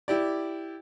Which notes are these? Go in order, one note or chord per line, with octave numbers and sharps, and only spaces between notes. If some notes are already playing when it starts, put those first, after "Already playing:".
E4 G4 D5